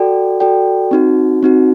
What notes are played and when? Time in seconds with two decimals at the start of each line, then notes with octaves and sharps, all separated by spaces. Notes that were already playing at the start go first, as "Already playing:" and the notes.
Already playing: F#4 A4 D5 G5
0.40 F#4 A4 D5 G5
0.91 C4 D#4 F#4
1.43 C4 D#4 F#4